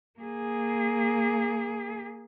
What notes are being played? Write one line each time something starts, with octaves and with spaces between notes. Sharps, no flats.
A#3 G#4